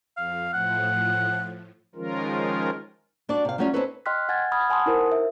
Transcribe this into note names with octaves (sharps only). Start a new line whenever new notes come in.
F2 F5
A2 F3 F#5
D#3 F3 G#3 C#4 F4 A#4
G3 D4 F#4 D5
C3 F5
F#3 G3 A3 C#4 D#4 F4
C4 C#4 D#4 A4 B4 C#5
D#5 G5 C6 F6 F#6 B6
F#5 G#5 G#6 A6
B5 D#6 F6 G#6
F#5 G#5 A5 C6 D#6
D#4 E4 A#4 C5
E5